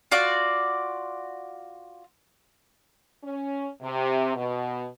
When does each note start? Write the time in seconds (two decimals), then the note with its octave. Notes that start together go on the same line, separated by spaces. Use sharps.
0.12 F4 F#4 D5
3.23 C#4
3.82 C3
4.35 B2